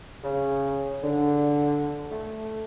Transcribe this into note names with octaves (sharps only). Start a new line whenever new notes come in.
C#3
D3
A3